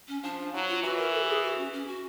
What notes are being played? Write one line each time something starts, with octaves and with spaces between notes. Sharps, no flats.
C#4
F3 D4
F#3 E4
F4
E3 F#4
A#4
A4
G4
G#4
F#4
C#4
C#4
F#4